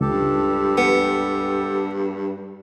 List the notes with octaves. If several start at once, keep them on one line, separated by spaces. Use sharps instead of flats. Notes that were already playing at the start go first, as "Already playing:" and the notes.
C#2 G2 G4 A4
B3